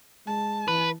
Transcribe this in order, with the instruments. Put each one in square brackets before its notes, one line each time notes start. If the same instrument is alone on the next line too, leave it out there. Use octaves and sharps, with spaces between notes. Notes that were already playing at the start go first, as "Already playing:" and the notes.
[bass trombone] G#3 [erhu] A5
[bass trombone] E3 [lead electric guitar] B4